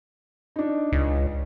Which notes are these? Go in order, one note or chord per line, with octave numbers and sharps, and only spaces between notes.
D4 D#4
C#2